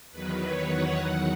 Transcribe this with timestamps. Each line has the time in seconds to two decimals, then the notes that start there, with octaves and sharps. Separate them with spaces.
0.11 E2 D#3 F#3 B4
0.41 C#5
0.69 F#5
0.97 E2 D#3 F#3